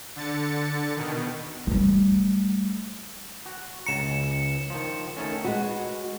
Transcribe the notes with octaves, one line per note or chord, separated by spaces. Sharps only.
D3 A6 C#7
B2 D#3
G3 A3
F#4
C#2 A#5 C#7 E7
D#3 F3
D#3 A3 C#4
G#3 F#4 B4